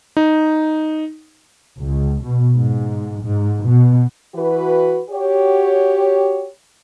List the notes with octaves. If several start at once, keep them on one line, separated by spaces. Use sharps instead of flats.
D#4
C#2
B2
G#2
G#2
B2
E3 F#4 B4
F#4 G4 C#5